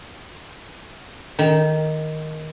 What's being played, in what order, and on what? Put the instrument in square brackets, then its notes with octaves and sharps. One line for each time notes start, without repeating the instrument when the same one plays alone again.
[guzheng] D#3